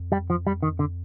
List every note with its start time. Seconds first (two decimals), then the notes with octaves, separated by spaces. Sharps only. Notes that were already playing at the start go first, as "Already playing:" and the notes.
Already playing: F2
0.12 G3
0.30 F3
0.47 G3
0.63 D#3
0.79 D3